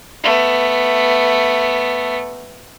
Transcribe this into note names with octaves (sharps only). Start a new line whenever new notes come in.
A3 B3